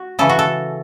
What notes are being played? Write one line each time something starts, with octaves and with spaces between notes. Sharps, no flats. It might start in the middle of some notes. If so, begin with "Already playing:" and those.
Already playing: F#4
C#3 E3 C#4 A4
F#4
A4